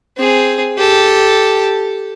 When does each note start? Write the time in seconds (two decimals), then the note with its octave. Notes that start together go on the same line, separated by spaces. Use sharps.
0.18 C4 G#4
0.78 G4 A4